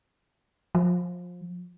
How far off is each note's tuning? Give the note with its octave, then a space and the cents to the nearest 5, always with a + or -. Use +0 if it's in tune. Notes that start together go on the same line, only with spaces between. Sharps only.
F3 +25